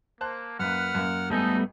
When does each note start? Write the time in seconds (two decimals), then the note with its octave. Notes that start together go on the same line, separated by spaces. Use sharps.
0.21 A#3 C5 A5 F#6
0.59 F#2 A#3 B4 F#5 F6
0.95 F#2 A#3
1.30 G#1 G3 A3 B3 D#4 A4 G#5